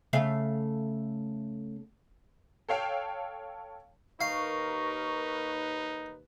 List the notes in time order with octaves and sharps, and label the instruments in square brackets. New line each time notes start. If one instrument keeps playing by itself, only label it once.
[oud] C#3 A3 F5
[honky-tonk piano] A4 C#5 F5 G5
[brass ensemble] D#2 B4 [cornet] D#4 [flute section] A#4 C#6 [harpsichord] F5